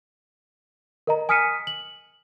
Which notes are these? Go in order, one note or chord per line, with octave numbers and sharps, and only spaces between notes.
A#4 D#5 A#5
G#5 D#6 F6 B6 C#7 D#7
F#7